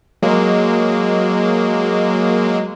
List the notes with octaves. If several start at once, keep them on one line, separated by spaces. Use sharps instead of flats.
F#3 G#3 A#3